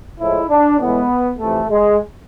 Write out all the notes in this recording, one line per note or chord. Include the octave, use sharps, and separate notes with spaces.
A2 F3 G#3 E4
D4
A2 E3 G#3 B3
F2 C3 E3 A3
G#3